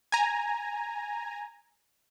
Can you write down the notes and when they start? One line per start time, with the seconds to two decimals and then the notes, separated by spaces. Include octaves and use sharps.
0.12 G#5 A#5